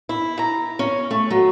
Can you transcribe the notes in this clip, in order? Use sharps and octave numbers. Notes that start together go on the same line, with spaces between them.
E4
A#5
C#4
A3
F#3